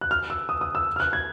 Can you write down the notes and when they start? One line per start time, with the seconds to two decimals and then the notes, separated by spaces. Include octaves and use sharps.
0.01 F#6
0.11 F6
0.30 E6
0.49 D#6
0.61 D#6
0.75 E6
0.96 F6
1.00 F#6
1.13 G#6